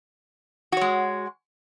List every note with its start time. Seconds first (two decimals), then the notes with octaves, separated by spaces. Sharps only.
0.72 F#4
0.77 C#5
0.81 G#3